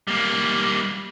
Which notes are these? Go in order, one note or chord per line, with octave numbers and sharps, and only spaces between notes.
G3 A#3